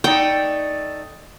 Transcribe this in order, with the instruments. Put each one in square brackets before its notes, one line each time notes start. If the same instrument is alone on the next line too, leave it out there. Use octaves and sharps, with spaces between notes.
[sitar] A3 D#4 D5 [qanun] G5